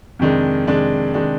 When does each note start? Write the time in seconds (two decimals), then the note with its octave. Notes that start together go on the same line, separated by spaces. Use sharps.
0.19 F2 C3 D#3 G#3 D4
0.67 F2 C3 D#3 G#3 D4
1.14 C3 D#3 G#3 D4